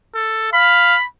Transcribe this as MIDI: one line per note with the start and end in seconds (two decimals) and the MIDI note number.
0.14 0.49 69
0.53 0.95 77
0.53 1.06 83